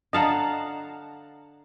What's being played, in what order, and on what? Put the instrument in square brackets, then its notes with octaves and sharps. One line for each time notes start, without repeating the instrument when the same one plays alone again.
[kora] D3 F5 F#5 [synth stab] D#5 A5 A#5